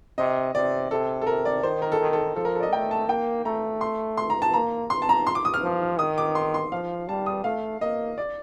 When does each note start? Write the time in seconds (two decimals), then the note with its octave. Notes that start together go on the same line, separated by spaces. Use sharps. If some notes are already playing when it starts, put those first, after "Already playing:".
0.18 C3 D#5
0.55 C3 D5
0.90 C3 A4
1.21 A4
1.27 C3 A#4
1.45 D5
1.63 D#3 C5
1.82 A#4
1.92 A4
2.00 D#3
2.13 A4
2.36 F3 A4
2.45 A#4
2.55 A4
2.60 D5
2.63 D#5
2.72 A3 G5
2.91 A5
3.09 A#3 G5
3.45 A3 A#5
3.81 C6
4.17 C6
4.30 A#5
4.42 A5
4.53 A#3 A#5
4.90 C6
5.02 A5
5.09 A#5
5.27 C6
5.35 D6
5.45 D#6
5.54 F6
5.63 F3
5.99 D#3 D#6
6.18 D6
6.35 C6
6.54 C6
6.72 F3 F5
7.08 G3 A5
7.26 D#6
7.44 A3 F5
7.81 A#3 D#5
8.18 D5